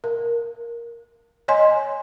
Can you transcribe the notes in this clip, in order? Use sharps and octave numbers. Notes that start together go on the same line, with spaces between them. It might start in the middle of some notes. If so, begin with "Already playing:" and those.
A#4
C#5 D#5 G#5 C6